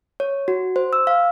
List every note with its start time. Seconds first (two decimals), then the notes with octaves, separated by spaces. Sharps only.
0.20 C#5
0.48 F#4
0.76 C5
0.93 E6
1.07 F5